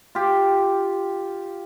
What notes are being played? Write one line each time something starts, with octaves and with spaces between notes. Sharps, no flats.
F4 G4